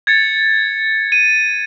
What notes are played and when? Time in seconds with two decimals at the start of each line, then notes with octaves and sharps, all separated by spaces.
0.07 G#6 A6 C#7
1.12 D#7